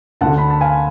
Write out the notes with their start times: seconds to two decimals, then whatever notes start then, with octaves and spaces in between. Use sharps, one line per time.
0.21 D2 D3 F#5 A5
0.38 B5
0.50 A5
0.61 F5 G#5